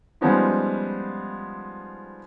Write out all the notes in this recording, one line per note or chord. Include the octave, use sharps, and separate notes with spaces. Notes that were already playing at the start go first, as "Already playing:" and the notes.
F3 G3 G#3 B3 C#4 D#4